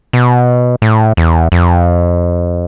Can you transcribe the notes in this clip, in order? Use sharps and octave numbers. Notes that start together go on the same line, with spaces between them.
B2
A2
E2
F2